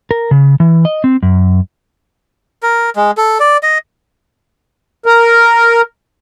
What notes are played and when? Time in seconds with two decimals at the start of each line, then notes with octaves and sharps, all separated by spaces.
0.11 A#4
0.31 C#3
0.60 E3
0.85 D#5
1.04 C4
1.23 F#2
2.63 A#4
2.96 G#3
3.18 A4
3.40 D5
3.63 D#5
5.06 A#4